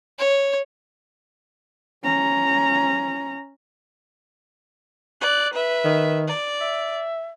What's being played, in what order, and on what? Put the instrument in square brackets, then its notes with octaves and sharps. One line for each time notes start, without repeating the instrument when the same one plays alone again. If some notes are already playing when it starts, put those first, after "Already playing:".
[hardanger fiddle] C#5
[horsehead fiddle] C#4 A#5
[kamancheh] D5 F#6
B4 E5
[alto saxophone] D#3
[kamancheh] D5
[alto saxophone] E5